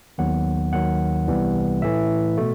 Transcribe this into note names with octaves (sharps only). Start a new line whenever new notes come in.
D#2 D#3 F#3 B3 F#5
D#2 D#3 F#3 F#5
C2 C3 E3 G3 B3
A2 E3 A3 E5
B2 A3